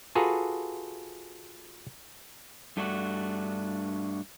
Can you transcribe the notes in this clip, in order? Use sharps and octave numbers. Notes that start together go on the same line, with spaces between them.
F4 F#4 G#4 A4 B4 A#5
G2 A3 D4 F#4